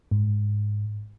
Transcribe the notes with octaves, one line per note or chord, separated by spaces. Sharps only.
G#2